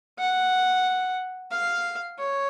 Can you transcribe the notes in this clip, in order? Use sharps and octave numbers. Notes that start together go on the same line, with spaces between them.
F#5
F5
C#5